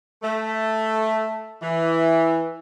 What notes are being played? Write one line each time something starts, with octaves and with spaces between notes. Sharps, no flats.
A3
E3